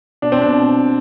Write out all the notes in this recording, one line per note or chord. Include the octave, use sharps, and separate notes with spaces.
B2 D4
C4
B2 D4